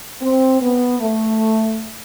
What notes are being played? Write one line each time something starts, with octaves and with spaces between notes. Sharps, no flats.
C4
B3
A3